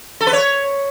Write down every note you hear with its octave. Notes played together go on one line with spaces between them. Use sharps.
A4
B4
C#5